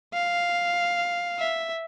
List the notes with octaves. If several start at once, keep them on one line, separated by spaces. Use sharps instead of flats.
F5
E5